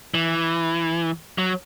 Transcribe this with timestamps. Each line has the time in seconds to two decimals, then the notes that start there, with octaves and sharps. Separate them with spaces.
0.14 E3
1.38 F#3